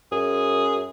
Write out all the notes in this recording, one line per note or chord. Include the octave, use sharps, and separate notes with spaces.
F#2 G#4